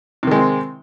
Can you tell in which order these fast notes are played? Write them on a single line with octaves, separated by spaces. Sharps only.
C3 D#3 G#3 C4